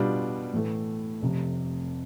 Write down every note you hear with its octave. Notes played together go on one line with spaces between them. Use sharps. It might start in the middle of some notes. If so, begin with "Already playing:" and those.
Already playing: B2 G3 D4 F4
A2 E3 A3
F1 F2 C3